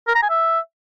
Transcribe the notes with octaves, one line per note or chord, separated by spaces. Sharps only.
A#4
A#5
G#5
E5